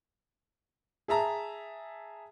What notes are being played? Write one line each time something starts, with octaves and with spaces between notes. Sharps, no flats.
G#4 E5 A5 A#5